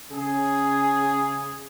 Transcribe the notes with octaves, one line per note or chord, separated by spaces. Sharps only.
C#3 G#4